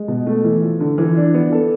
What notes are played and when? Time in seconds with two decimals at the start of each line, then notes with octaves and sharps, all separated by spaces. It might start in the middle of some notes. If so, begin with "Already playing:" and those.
Already playing: G#3
0.08 B2
0.27 A3
0.44 E3
0.62 F3
0.80 D3
0.98 E3
1.17 D4
1.34 B3
1.52 A4